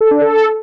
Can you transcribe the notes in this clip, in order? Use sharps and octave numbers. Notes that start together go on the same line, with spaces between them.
A4
D4
A4